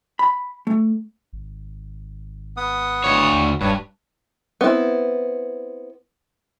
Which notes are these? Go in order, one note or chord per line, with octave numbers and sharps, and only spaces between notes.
B5
A3
G#1
B3 F#5 D#6
D2 C#5
D#2
E1 G2 B4 C#5
B3 C4 E4